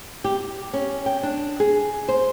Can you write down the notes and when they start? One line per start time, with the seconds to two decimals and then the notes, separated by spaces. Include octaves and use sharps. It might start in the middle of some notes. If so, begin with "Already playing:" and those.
0.24 G4
0.73 C#4
1.06 G5
1.23 D4
1.60 G#4
2.08 C5